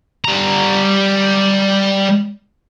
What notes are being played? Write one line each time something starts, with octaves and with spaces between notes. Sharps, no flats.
G3 A#5